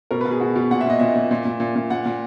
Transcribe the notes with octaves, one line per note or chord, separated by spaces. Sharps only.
B2 A#4
B4
B2
G#4
B2 F#4
B2
A#2 F#5
E5
A#2 D#5
A#2 E5
A#2
A#2
A#2
A#2
A#2
A#2 F#5
A#2